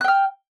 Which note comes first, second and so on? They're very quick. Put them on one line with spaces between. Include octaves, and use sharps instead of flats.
F#6 G5 F6